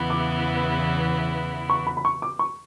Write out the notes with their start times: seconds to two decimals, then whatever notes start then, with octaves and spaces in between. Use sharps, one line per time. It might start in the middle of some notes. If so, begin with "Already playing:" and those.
Already playing: E2 C#3 E3 B3 E4
0.10 D6
1.70 C#6
1.87 B5
1.97 B5
2.05 C#6
2.22 D6
2.39 C#6